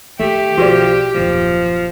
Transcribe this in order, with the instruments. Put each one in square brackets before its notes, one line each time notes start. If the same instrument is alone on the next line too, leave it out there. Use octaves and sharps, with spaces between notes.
[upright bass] D#3 [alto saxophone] A3 [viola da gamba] G4
[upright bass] B1 [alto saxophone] F3 [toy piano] F#4 G#4 D5
[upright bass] D#1 F#2 [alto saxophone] F3